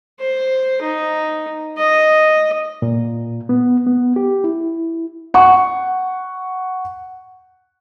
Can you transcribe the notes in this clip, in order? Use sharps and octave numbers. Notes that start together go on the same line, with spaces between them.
C5
D#4
D#5
A#2
B3
B3
G4
E4
F#5 C#6